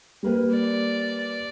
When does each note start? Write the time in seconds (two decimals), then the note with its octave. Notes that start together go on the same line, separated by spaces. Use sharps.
0.23 G3 A#3 B4
0.53 D5